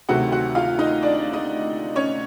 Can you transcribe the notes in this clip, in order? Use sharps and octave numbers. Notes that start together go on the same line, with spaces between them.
D2 C3 D#3 F#3 A3 F#4 F#5
F#4 F#5
F4 F5
D#4 D#5
D4 D5
D#4 D#5
C#4 C#5